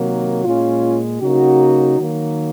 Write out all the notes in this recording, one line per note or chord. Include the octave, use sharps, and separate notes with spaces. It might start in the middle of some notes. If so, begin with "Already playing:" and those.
Already playing: C3 D#3 F#3 A#3
A#2 G#3 C#4 F4
C#3 F#3 A#3 D#4 F#4
D#3 F#3 A#3